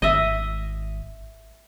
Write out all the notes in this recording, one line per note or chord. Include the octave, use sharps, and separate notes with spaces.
G#1 D#5 E5